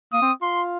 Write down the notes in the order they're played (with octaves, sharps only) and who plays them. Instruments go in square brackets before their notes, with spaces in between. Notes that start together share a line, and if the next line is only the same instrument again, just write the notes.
[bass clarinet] A#3 [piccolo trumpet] D#6
[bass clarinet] C4
[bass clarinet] F4 [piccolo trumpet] C6